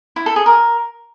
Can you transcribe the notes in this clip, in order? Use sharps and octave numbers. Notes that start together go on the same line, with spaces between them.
E4
A4
G#4
A#4